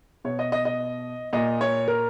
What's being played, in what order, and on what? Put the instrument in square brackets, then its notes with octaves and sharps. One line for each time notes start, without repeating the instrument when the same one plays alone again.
[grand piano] B2 C#5
D#5
D#5
D#5
A#2 D#5
C#5
A#4